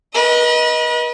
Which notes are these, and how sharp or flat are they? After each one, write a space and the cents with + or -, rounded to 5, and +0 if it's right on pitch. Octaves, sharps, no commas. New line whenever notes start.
B4 -35 D#5 +10